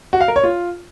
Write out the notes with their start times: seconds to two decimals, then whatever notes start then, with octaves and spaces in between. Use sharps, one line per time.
0.13 F#4
0.21 F5
0.28 A#4
0.36 C#5
0.44 F4